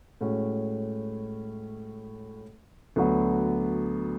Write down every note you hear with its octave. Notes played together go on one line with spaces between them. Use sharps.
A2 G#3 C#4 F#4
D2 D3 F#3 B3 F#4